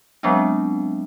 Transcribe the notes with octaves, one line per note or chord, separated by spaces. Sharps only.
F#3 G#3 B3 C4 D4